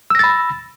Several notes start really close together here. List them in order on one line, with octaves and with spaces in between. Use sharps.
E6 A#6 A6 B5